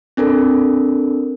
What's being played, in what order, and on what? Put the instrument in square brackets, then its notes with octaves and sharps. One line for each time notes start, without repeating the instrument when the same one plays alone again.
[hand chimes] C4 D4 A4 A#4